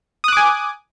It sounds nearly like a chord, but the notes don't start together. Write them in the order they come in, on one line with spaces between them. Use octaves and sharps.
D#6 F#6 D6 G#5